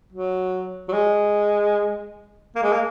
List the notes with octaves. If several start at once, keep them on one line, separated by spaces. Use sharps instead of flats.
F#3
F#3
G#3
A#3
G#3
A#3